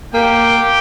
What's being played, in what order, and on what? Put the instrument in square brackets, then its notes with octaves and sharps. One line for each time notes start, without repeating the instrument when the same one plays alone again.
[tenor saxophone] A#3 [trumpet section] G4 G5